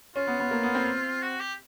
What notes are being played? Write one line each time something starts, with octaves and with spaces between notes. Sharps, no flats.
C#4 F4
B3
B3
A#3
B3
C4
F#4
G4